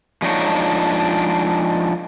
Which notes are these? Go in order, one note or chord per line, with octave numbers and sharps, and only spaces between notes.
F3 G#3 D4 D#4 C#5